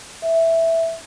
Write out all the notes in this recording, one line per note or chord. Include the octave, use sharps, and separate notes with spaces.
E5